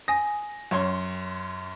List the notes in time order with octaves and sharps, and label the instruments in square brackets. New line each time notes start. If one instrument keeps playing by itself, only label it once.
[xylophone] G#5 D#6 [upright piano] A#6
[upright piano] F#2 C#5 C6